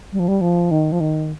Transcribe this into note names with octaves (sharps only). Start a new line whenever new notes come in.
G3
F3
G3
F3
D#3
F3
D#3